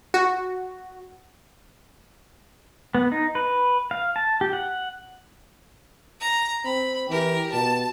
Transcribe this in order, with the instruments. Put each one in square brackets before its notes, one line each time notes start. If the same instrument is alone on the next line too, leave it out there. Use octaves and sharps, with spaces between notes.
[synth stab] F#4
[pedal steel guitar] B3
D#4
B4
F5
A5
G4
F#5
[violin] A#5
[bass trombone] C4 [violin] B5
[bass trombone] E3 [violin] G4 A#4
[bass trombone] B2 [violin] A5